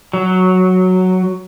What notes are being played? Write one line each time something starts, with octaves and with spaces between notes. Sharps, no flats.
F#3